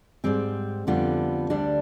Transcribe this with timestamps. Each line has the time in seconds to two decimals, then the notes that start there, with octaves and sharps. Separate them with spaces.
0.24 G#2 G3 C4
0.87 F2 D3 G3 B3 F4
1.50 D2 D3 G3 D4